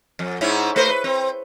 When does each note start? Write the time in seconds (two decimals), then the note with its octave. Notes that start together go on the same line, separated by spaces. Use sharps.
0.19 F2
0.41 G#2 C#4 E4
0.76 A3 B4 C5
0.89 B4
1.04 C4